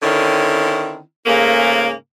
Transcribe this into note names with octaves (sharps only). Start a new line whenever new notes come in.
D3 D#3 C4 C#4 E4
G#2 C#3 A3 A#3